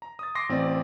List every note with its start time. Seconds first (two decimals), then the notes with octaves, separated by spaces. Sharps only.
0.02 A#5
0.19 D#6 A6
0.35 C6 D6 A#6 C7
0.49 A1 C4 D5